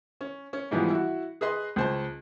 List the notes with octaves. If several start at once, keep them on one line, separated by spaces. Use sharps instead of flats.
C#4
C#4
G#2 E3 F3 G3 B3
E4 F#4
G#4 B4 D#5 C6
C#2 C5 A5